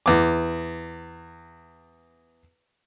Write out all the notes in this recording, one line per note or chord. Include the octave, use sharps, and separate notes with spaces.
E2 D6